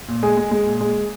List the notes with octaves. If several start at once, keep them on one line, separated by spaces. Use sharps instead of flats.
A#2
G#3 G#4
G#3
G#3
A#2
G#3